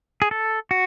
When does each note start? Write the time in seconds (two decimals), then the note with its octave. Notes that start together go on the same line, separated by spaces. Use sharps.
0.22 G#4
0.31 A4
0.71 F#4